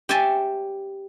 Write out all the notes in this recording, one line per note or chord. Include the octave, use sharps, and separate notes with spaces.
G4 C5 C#5 E5 G#5 A5